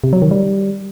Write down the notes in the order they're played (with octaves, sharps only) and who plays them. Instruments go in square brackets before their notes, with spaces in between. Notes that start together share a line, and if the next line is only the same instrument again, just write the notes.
[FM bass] C3
F#3
D#3
G3